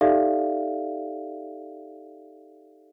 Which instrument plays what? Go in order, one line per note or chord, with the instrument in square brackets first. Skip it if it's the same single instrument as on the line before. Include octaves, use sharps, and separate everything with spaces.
[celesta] D#4 G4 A4 D5 E5 F5